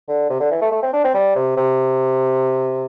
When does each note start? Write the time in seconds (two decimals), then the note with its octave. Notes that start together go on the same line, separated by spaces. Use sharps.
0.08 D3
0.30 C3
0.40 D3
0.51 E3
0.61 A3
0.71 A3
0.82 C4
0.93 D4
1.04 C4
1.14 G3
1.35 C3
1.56 C3